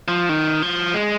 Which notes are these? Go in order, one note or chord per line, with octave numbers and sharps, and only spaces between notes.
F3
D#3
F3
G#3